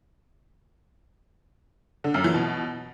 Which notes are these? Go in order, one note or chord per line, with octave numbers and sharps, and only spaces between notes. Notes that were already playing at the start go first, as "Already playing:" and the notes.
D3
F#2
E3
B2